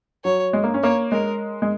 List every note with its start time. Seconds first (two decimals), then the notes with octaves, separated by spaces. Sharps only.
0.24 F#3 C#5
0.53 G#3
0.64 A#3
0.74 C#4
0.83 A#3 C#5
1.12 G#3 A#4
1.62 G#3